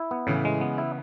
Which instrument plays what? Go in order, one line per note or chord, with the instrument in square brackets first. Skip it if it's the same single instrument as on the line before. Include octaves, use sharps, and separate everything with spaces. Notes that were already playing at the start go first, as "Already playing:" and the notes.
Already playing: [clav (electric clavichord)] E4
B3
[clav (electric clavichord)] A2 [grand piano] C#3 E3
[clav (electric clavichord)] G#3
B3
E4